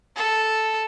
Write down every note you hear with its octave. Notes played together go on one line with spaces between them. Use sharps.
A4